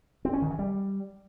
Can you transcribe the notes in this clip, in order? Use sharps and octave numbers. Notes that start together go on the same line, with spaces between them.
C4
C#4
D#3
E3
G3